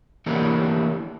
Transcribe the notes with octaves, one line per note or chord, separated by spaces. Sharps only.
E3 A3 A#3 D4 E4 G4